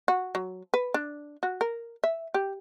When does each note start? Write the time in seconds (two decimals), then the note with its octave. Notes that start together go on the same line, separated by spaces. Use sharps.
0.08 F#4
0.35 F#3
0.74 B4
0.94 D4
1.43 F#4
1.61 A#4
2.04 E5
2.34 G4